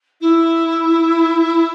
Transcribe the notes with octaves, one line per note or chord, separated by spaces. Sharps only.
E4